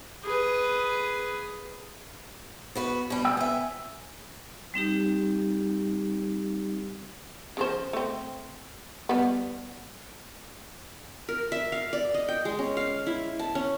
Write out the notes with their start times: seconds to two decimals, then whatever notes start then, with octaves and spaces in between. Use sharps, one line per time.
0.24 G#4 B4
2.75 B3 F#4 B4
3.10 B2 G3
3.25 G5 E6
3.37 B3 E5 G#5
4.74 G3 C4 D#4 G4
7.57 C#3 F3 C5
7.93 A3 C4
9.09 G3 B3
11.29 A#4
11.52 E5
11.72 F5
11.93 D5
12.14 D#5
12.29 G5
12.45 G#3
12.59 C#4
12.77 F5
13.06 E4
13.39 A5
13.55 C#4